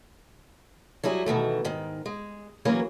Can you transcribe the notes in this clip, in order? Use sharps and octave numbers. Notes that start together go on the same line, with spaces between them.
F#3 G3 E4 G#4
B2 D#3 E3 A3
G#2 D#3
G#3
E3 F#3 A#3 C#4 G#4